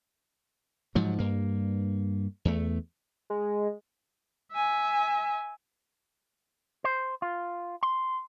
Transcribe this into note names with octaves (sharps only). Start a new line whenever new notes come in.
G#2 F3 F#3
G2 A#3
E2 A3
G#3
E5 G#5
C5
F4
C6